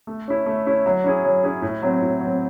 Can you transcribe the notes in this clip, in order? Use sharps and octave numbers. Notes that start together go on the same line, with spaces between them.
A3
C#4 E4
A3
C#4 E4
F#3
C#4 E4 G#4
F#3
C#4 E4 G#4
A2
F#3 C4
A2
F#3 C4